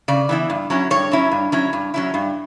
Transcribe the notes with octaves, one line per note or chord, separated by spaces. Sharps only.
C#3 D5
E3 B3 E4
G2
F#3 C#4 E4
G2 C#5
F#3 C#4 E4
G2
F#3 C#4 E4
G2
F#3 C#4 E4
G2